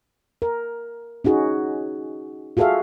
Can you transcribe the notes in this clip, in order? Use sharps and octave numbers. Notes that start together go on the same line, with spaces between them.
A#4
C#4 D#4 F#4 G#4
F4 F#4 G#4 A4 E5 F5